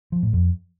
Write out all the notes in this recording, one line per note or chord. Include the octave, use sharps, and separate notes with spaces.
F3
A2
F2